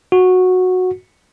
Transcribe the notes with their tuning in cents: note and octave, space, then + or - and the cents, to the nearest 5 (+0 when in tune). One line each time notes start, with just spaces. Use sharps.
F#4 -10